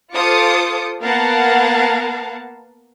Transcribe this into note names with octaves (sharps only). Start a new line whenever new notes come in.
F4 A4 C5 D6 D#6 C#7
A#3 B3 A#4 F5 F#5 A5